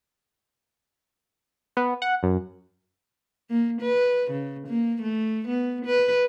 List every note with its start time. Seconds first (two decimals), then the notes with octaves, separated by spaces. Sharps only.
1.77 B3
2.02 F#5
2.23 F#2
3.50 A#3
3.82 B4
4.31 C#3
4.68 A#3
5.02 A3
5.48 B3
5.85 B4